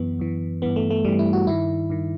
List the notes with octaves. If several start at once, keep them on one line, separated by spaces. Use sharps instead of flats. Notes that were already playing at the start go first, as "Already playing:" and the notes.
Already playing: F#2 E3 B3
F#2 E3
G2 E3 B3
A3
A3
G2 E3 G3
E4
F#4
G2 D#3 E4
G2 D#3